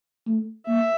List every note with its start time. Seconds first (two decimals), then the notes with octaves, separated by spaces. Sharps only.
0.27 A3
0.67 A#3 E5